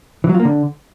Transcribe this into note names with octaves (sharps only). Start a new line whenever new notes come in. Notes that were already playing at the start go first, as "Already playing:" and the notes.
E3
F#3
F4
A#3
D3